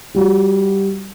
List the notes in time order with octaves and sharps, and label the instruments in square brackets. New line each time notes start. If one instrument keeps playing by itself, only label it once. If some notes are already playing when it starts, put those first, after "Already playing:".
[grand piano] G3 F#4